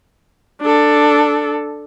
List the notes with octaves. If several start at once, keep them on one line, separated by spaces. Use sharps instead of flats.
D4 A4